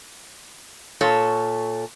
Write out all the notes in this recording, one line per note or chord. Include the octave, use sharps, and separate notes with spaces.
A#2 A4 C#5